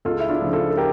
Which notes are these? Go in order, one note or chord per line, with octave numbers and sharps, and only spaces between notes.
C#2 F4 A4
E4
D4 F4
C#3 F3
F4 A4
A4
G4 A#4